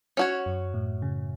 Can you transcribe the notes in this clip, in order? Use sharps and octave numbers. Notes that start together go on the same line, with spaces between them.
C#4 F#4 C#5
F#2
A2
C#3